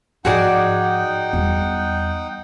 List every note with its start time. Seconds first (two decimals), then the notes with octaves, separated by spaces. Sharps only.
0.25 G#2 F3 D#4 F#4 G#4 D5 F#5 G5
1.33 E2 G3